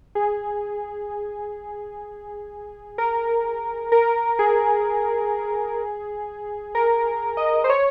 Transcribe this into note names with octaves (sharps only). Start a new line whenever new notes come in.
G#4
A#4
A#4
G#4
A#4
D#5
C5
C#5